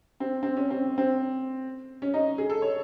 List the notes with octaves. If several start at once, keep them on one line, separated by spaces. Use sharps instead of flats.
C4
C4
C#4
C4
C4
C#4
D#4
G#4
A4
C#5